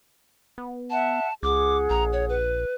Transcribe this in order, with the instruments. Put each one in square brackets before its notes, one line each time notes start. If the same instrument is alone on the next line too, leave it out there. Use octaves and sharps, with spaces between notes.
[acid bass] B3
[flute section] E5 F#5 [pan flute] A5
[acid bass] C#2 [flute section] G#4 F#5 [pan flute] D6
[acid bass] A#1 [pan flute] A#5
[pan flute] C#5
B4